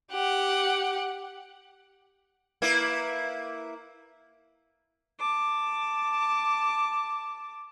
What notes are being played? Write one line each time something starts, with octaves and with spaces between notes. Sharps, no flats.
G4 F#5
A#3 E4 B4
A5 D6